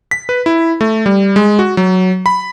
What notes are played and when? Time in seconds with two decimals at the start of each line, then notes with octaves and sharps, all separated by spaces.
0.11 B6
0.29 B4
0.46 E4
0.81 A3
1.06 G3
1.36 G#3
1.59 F#4
1.77 F#3
2.26 B5